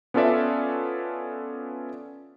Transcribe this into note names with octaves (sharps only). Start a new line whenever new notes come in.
B3 C#4 F4 A4 D5 E5